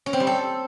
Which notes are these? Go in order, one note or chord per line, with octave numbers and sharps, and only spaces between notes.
C#4
C4
G3
A4